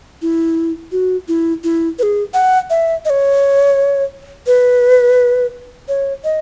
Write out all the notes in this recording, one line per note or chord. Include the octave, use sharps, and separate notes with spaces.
E4
F#4
E4
E4
B4
G#4
F#5
E5
D#5
C#5
B4
C#5
D#5